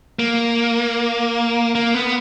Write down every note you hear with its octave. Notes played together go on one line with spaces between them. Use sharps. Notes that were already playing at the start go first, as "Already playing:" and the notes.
A#3
A#3
B3